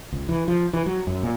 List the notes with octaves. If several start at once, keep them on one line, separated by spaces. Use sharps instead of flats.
C#2
E3
F3
E3
F#3
F#2
A#2